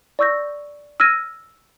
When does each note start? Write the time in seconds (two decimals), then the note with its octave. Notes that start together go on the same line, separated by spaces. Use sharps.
0.19 D5 C#6 E6 G6 A#6
1.00 E6 F6 G#6 A#6 D#7